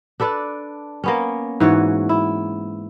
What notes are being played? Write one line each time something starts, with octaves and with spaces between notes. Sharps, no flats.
D4 A4 B4 D5
A#3 B3 C#4
G#2 E3 F#4 C#5
E4